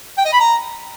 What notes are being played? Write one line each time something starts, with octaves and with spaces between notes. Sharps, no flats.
G5
D#5
B5
A#5